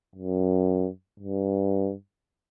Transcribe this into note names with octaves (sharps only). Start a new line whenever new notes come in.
F#2
G2